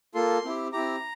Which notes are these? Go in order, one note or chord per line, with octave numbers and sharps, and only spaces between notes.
A#3 F4 A4 C6
C4 E4 G4
C4 E4 G4 A#5